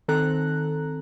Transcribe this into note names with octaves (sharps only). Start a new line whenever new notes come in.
D#3 C4 A4 A#5 F#6